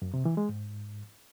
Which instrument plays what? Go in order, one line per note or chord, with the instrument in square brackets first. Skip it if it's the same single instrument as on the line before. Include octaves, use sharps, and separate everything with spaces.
[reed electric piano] F#2
C3
E3
G#3
G#2